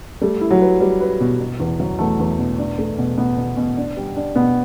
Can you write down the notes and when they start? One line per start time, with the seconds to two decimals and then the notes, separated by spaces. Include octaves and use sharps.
0.22 G3 A3
0.41 E4
0.51 F#3
0.61 B4
0.80 G3 B4
1.00 B4
1.20 B2
1.40 B2
1.60 E2
1.80 F#3
1.99 E2 A3
2.19 E2
2.38 B2
2.58 D4
2.78 A3
2.98 B2
3.18 B2 B3
3.37 B2
3.57 B2
3.77 D4
3.97 G3
4.16 D4
4.36 B2 B3